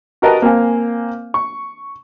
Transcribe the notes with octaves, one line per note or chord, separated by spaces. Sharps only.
F#4 G4 A#4 B4 D#5 A5
A#3 C4 F5 G#5
C#6